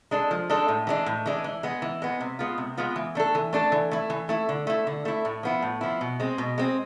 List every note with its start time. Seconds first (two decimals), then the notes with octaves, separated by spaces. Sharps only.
0.11 G#3 D4 A4
0.31 F3
0.50 G#3 D4 A4
0.69 A2
0.87 E3 G#3 D4
1.06 A2
1.26 E3 G#3 D4
1.44 E3
1.63 G#3 B3
1.82 E3
2.02 G#3 B3
2.21 C3
2.39 G#3 B3 F4
2.58 C3
2.77 G#3 B3 F4
2.96 E3
3.15 A3 D4 A4
3.35 E3
3.53 A3 D4 A4
3.72 E3
3.91 A3 E4
4.10 E3
4.29 A3 E4
4.49 D3
4.67 A3 E4
4.87 D3
5.05 A3 E4
5.25 A2
5.43 F3 B3 E4
5.62 A2
5.81 F3 B3 E4
6.01 B2
6.20 G#3 C4
6.38 B2
6.58 G#3 C4